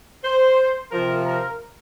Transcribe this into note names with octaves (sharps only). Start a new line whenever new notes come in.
C5
C3 F3 A#4
A#4